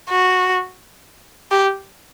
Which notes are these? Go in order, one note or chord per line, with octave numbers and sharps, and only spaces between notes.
F#4
G4